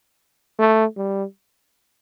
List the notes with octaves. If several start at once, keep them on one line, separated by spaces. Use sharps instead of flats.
A3
G3